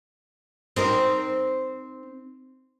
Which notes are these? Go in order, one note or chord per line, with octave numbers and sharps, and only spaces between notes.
C4 D#4 A#4